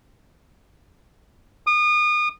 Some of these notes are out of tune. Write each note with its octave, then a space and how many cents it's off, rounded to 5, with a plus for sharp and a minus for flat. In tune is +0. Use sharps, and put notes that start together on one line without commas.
D#6 -35